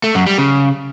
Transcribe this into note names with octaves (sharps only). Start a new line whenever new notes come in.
A3
F#2
G3
C#3